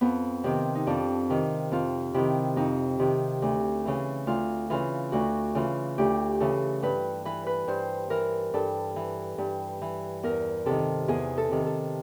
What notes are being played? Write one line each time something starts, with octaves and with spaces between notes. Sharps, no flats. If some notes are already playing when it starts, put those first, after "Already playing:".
F2 B3
C3 D#3 C4
D#4
F2 D4
C3 D#3
F2 F4
C3 D#3 E4
F2 D#4
C3 D#3
D2
C#3 E3
D2 F4
C#3 E3 F4
D2 F#4
C#3 E3 F4
D2 G4
C#3 E3 A4
G2 B4
E3 B4
B4
G2 C5
E3 A#4
G2 A4
E3
G2
E3
E2 A#4
C3 D#3 A4
E2 G#4
A4
C3 D#3
A4